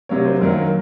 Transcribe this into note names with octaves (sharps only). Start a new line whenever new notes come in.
C3 F#3 A#3 C#5
C5
F#2 D#3 F#3 A#3 A#4